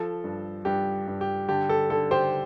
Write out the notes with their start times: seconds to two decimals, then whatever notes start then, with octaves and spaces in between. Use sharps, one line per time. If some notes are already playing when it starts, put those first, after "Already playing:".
Already playing: F3 A4
0.24 G2
0.65 G2 G4
1.08 G2
1.21 G4
1.49 D3 G4
1.69 A4
1.90 D3 A4
2.11 G4 C5